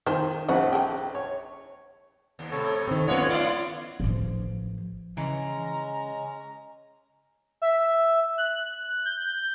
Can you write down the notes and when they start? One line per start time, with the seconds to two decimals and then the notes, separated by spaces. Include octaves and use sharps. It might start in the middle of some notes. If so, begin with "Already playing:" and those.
0.06 D#3 F3 C5
0.48 A#1 C4 C#4 E4 F#5
0.73 C#3 A4 G5
1.15 C#5
2.39 D#2
2.51 A2 C3 A4 C#5
2.88 D#3 C4 A4
3.08 F2 B3 C#4 F4 C#5 D#5 F#5
3.30 A3 E4 F4 D5 F5 C6
4.00 A1 F3
5.17 C#3 E3 G#3 C#4 A#5
7.62 E5
8.38 F#6
9.05 G6